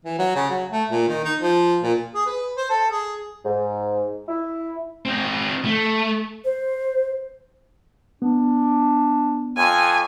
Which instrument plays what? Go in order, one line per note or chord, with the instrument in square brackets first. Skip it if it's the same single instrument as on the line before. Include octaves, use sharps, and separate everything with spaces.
[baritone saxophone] E3
F#3
C#3
F#3
A3
A#2
D#3
D#4
F3
A#2
[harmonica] G#4
B4
C5
A4
G#4
[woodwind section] G#2
E4
[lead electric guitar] C4 D#4
A3
[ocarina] C5
[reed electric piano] B3 [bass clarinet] D4
[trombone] F2 [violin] G#5